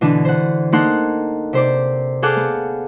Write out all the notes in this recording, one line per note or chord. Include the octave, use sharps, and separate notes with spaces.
B2 D3 E3 D4
C5 F#5
A#3 D#4 A4 F#5 C6 F#6
C3 C5 D5
G#4 A4 F5 F#5 D6 G6
B3